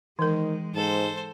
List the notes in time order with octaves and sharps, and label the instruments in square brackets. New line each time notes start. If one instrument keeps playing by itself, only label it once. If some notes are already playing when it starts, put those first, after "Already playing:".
[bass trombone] D#3 [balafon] E3 A#4 [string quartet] G#3
[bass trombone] G#2 [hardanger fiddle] A4 C5